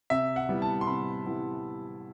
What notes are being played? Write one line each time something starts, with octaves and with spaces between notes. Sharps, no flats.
C3 E5
F#5
G3 B3 E4
A5
C6
C3 B5
G3 B3 E4